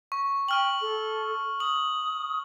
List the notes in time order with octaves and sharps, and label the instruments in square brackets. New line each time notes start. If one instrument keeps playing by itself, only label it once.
[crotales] C#6
[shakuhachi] G5 [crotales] C#6 F6 F#7
[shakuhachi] A4
[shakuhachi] D#6 [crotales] F#7